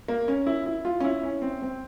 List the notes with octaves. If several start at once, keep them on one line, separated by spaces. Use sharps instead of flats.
A#3
C#4
E4
E4
F4
C#4
E4
C#4
C4
C4